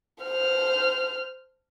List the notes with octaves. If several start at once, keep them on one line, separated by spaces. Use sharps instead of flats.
C5 F6